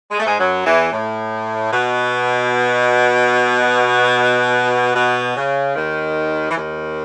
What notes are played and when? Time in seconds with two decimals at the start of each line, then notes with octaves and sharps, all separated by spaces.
0.10 G#3
0.18 A3
0.25 G#2 G#3
0.38 F#2 F#3
0.64 E2 E3
0.90 A2
1.71 B2
4.94 B2
5.35 C#3
5.75 D#2 D#3
6.49 E3
6.55 D#2 D#3